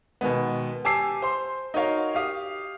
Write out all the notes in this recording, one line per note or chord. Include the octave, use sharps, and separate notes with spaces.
B2 D#3 G#3 B3
G4 G#5 A5 D6 E6 C7
C5 C6
D#4 F#4 A#4 C#5 F5
G4 F5 D#6